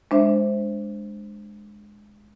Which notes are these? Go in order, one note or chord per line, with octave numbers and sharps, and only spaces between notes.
G#3 D4 C5 E5